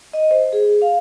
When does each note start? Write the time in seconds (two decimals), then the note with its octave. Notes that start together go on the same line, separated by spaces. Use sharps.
0.13 D#5
0.31 C5
0.53 G#4
0.82 F5